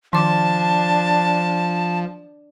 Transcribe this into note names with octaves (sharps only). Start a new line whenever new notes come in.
D#3 F3 D4 A5 D6